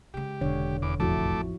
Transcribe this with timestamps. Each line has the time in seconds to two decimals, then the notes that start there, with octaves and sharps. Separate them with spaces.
0.14 C#3 G#3 G4
0.41 E1 D3 C#5
0.82 E2 D6
1.00 A1 F2 F3 A3 E4 F#4 A5 D6